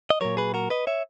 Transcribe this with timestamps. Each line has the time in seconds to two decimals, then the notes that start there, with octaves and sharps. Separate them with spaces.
0.10 D#5
0.21 A#2 F#3 A#4 C#5
0.37 G#4 B4
0.54 F#4 A#4
0.70 B4 D#5
0.87 C#5 E5